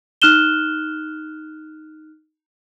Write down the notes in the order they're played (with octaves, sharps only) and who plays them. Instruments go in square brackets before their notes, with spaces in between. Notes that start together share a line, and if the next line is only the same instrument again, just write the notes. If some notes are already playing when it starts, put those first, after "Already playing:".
[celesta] D#4 F6 F#6 E7 G7